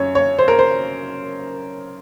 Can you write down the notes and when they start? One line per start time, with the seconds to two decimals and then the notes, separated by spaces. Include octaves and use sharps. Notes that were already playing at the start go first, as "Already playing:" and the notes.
Already playing: F#2 C#4 C#5
0.15 C#5
0.39 C5
0.48 A#4
0.59 C5